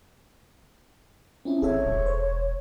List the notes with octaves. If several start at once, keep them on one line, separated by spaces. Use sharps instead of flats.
C4 C#4 E4
G#1 G#4 A4 C#5 E5
E1
C5